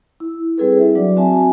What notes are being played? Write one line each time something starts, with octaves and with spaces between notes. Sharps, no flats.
E4
G3 C4 E4 G#4 A4 B4
E5
F#3 D4 F#4 D5
C4 F#4 E5 G#5 A5